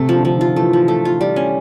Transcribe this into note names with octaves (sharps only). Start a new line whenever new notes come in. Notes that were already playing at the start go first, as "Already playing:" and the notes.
Already playing: C3 A3
F3
D3
F3
D#3 F4
E3 A3
F3
A3
F4
G3
C#4